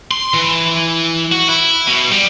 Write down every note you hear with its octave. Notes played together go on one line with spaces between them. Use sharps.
C6
E3
F#4
E4
B2
G3